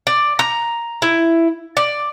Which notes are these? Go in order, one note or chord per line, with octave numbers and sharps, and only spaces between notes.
D5
A#5
E4
D5